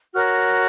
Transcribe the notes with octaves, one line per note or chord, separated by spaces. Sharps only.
F#4 A#4 C#5 F6